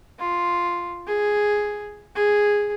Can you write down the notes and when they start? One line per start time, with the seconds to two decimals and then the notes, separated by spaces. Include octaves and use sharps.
0.19 F4
1.07 G#4
2.15 G#4